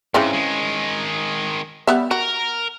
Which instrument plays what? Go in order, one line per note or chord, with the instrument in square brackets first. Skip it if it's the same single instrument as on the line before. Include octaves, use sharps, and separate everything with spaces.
[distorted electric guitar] G#2 [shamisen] C#3 E3 C4
[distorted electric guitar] D#3 G#3
[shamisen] G3 B3 E5
[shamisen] F#4 [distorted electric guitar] A#4